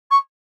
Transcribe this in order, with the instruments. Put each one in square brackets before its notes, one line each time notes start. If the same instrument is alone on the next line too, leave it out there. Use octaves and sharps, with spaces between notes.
[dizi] C#6